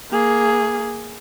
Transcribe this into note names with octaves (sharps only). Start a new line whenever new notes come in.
A#3 G#4